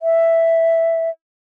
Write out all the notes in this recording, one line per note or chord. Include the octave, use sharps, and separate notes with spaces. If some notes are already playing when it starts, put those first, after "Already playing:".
E5